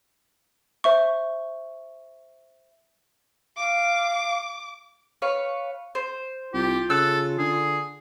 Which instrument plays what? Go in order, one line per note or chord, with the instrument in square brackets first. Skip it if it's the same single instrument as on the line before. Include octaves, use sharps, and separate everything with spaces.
[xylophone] C5 E5 C#6
[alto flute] F5 [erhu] D6
[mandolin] B4 C#5 F5
C5
[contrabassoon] C2 [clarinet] F4 [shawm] G4
[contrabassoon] C#3 [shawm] A4 [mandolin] E6 F#6
[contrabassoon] D3 [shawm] G#4